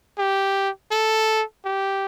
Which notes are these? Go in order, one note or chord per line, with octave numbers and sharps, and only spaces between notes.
G4
A4
G4